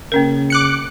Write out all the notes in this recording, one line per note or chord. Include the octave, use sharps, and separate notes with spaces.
C#3 A#3 C#4 A#4
D6 F#6 C#7